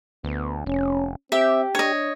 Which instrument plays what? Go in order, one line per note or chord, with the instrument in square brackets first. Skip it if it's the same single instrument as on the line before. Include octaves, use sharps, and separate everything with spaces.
[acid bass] D2 [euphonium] B3
[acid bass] F1 [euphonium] C#4
[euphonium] C4 [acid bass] G4 [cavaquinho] E5
[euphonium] D4 [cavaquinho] C#5 D#5